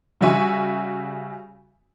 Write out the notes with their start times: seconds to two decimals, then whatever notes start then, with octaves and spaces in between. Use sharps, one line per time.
0.21 C#3 G3 F#4 E5 G#5 C#6